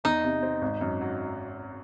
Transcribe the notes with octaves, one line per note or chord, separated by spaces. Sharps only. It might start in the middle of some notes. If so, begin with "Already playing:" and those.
E2 D#4
C3
C4
G#1
F#2
F#3